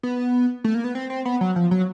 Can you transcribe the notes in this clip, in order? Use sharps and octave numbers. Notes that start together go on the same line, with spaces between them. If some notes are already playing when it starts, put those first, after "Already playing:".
B3
A3
A#3
B3
C4
C4
B3
F#3
F3
F#3